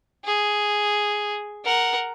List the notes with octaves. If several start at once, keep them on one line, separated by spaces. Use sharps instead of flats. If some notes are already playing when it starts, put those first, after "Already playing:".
G#4
A#4 F#5